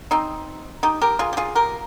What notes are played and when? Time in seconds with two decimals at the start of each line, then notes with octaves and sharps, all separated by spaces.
0.11 C4 D#4
0.83 D#4 G4
1.01 G4 A#4
1.19 F4 G#4
1.33 G4
1.37 F4 G#4
1.55 G4 A#4